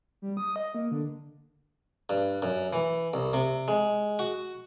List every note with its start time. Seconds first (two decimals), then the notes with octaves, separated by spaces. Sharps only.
0.22 G3
0.37 D#6
0.56 D#5
0.74 A#3
0.92 D3
2.09 G2
2.42 F#2
2.73 E3
3.14 C2
3.34 C3
3.68 G#3
4.19 F#4